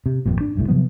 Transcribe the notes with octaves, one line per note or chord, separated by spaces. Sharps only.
C3
G#1 F2 A#2
D4
F#1 C2 A2
C3 F3 F#3 B3